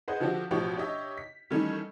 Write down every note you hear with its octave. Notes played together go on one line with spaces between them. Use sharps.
G#4 B4 C5 D#5 F#5
D3 F3 D4 F#4 G4
A1 B2 F3 G4 C#6
D4 G4 C#5 D#5 E5
B6
D#3 E3 G3 A3 C#4 D#4